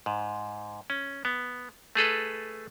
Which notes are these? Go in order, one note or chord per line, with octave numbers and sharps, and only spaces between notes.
G#2
C#4
B3
A3 G#4 A4 B4